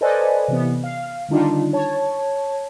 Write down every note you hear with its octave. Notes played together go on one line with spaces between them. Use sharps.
A4 B4 C5 D5 D#5 G#5
C3 E3 B3
F5
D3 D#3 G3 D4 D#4 F4
C#5 A5